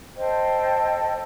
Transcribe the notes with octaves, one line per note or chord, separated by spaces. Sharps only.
A4 C5 D#5 G5